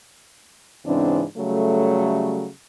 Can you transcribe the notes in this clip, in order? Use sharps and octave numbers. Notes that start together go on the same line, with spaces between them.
G#2 C#3 E3 C4 D4
C#3 F#3 G3 A3